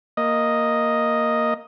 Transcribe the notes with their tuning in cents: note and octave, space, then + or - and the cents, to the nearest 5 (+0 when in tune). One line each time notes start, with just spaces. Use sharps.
A#3 +0 D#5 +0